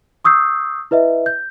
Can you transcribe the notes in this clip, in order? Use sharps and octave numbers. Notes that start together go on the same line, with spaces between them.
C#6 D#6 E6 G6 C7
E4 B4 D#5 E5
G6